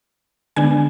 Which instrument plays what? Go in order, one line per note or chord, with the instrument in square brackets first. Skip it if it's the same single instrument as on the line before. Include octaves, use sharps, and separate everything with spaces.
[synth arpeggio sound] D3 G#3 B3 D4 G#5